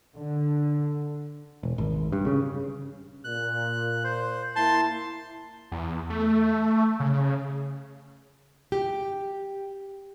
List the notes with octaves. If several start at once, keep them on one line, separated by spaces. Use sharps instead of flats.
D3
E1
G#1
G2
C#3
A#2 F#6
C5
A#3 E4 A5 C6
E2
A3
C#3
G4